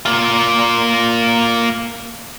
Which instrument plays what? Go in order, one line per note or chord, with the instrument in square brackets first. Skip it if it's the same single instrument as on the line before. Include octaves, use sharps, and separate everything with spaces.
[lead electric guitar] A#3 F4